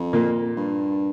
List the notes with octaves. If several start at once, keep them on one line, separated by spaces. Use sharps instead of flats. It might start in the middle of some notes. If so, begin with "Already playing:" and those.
Already playing: F2
A#2 A#3
G2